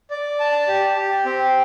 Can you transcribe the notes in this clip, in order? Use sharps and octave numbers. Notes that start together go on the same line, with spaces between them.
D5
A5
G4
G4
C4